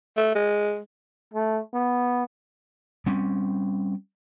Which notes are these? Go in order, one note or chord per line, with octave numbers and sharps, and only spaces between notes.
A3
G#3
A3
B3
G3 C4 C#4